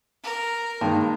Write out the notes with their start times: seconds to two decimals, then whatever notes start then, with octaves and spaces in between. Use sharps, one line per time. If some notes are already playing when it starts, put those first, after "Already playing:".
0.23 A#4
0.81 G2 D#3 G#3 A#3